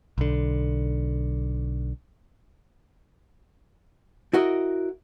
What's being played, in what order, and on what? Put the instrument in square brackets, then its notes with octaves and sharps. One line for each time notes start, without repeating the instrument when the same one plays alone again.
[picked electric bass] B1 D3
[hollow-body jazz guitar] E4 F#4 A#4 D#5